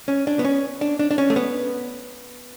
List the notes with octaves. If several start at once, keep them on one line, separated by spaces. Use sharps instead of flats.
C#4
D4
B3
C#4
D4
D4
D4
C#4
A3
B3